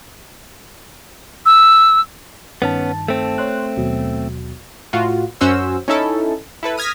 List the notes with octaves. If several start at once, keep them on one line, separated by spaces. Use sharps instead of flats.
E6
G2 D#3 B3 C#4 A5
A3 C4
C#5 C6 F#6
D#2 B2 F#3
A2 F4 F#4
F#2 C#4 F#4 C5 E6
C#4 D#4 E4 A4
E4 A4 B4
D#6 F6 G#6 A#6 B6